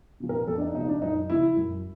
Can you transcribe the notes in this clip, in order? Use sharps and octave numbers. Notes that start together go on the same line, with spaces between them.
C3 F3
A#4
F2 A4
D4
D#4
C3 F3 D#4
D4
F#2 D#4
C#3 F3 E4
F#2